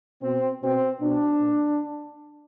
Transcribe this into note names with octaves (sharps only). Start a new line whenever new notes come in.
B2 C4
B2 C4
B2 D4
A#2